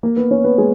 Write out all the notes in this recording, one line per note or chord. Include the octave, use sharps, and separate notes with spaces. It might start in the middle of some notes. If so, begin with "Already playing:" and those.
A#3 A#4
B3 B4
C#4 C#5
B3 B4
G#3 G#4